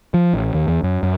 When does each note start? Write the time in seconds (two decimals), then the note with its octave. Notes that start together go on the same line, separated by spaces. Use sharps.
0.14 F3
0.34 A1
0.54 D#2
0.68 E2
0.83 F#2
1.03 F#2